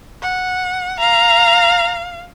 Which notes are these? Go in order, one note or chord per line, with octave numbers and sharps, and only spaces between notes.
F#5
F5 A#5